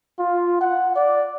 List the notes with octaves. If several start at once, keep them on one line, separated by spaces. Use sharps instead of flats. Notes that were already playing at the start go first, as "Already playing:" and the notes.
F4
F#5
D5